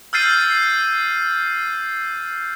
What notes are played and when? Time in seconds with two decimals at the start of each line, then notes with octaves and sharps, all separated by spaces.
0.13 E6 F6 G6 A6 C7 D#7